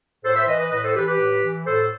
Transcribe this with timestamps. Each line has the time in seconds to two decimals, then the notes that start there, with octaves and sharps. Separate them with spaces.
0.24 A2 A4 C5
0.36 C5 E5
0.48 E3 B4 D#5
0.59 B4 D#5
0.71 A2 B4 D#5
0.84 A4 C5
0.95 E3 G4 B4
1.07 G4 B4
1.19 A2
1.43 E3
1.66 A2 A4 C5